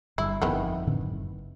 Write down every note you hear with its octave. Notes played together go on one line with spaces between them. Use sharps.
G1 G3 E4
G1 F2 D#3 E3 B3
A2 D3 C4
F#1